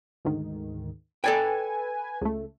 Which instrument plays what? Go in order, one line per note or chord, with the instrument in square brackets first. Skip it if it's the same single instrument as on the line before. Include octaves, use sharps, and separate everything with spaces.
[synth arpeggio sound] D2 G#2 D#3
[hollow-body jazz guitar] A4 D5 G5 [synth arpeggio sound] B4 G#5
[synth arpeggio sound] C#2 A3